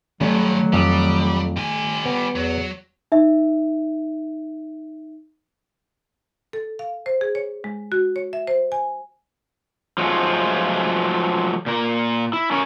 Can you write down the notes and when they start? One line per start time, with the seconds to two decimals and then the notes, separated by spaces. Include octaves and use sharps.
0.21 G2 D3 D#3 F#3 A3
0.73 F2 G3
1.57 G3 G#5
2.05 B3
2.36 E2 F#3
3.12 D#4 E5
6.53 A4
6.79 F5
7.06 C5
7.21 G#4
7.35 C#5
7.64 G#3
7.92 F#4
8.16 C#5
8.33 E5
8.47 C5
8.72 G#5
9.98 F3 F#3 G#3 A3 F4
11.66 A#2 A#4
12.33 E4
12.52 C#4 A#4 C#5